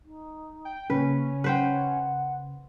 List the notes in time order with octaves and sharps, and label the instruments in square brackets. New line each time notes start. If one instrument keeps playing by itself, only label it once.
[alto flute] D#4
[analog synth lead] G5
[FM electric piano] C#3 [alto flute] A#3 [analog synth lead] C#4 [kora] B4
[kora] B4 C5 G5 [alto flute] F#5